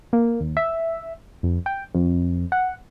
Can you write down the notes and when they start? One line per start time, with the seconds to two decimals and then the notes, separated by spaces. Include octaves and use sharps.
0.13 A#3
0.40 D#2
0.57 E5
1.43 F2
1.66 G5
1.95 F2
2.52 F#5